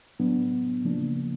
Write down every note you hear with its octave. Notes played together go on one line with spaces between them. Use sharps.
A2 F#3 B3 D4
C#3 F3 A#3 D4